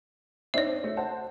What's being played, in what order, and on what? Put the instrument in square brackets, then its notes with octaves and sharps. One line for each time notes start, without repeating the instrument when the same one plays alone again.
[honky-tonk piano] C4 D4 D#4 [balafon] C#5 E5
[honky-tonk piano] A3
C5 F#5 A5